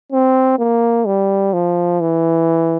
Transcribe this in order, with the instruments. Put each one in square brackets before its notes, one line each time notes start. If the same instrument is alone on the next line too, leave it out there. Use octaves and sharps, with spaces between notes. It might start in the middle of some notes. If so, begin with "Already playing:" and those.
[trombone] C4
A#3
G3
F3
E3